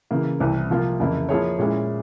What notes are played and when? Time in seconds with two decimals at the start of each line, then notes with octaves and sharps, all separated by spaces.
0.11 C#3 E3 A#3
0.40 C2 C3 E3
0.69 C3 F3 A#3 F4
1.00 F2 C#3 E3 A#3 E4
1.29 F3 A#3 E4 G#4 C#5
1.59 A#2 G#3 C#4 E4 G#4